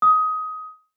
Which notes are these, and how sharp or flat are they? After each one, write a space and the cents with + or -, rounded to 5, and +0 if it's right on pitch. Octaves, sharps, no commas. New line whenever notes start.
D#6 +20